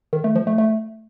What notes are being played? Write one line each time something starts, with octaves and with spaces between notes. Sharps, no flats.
D#3
A3
F3
A3
A3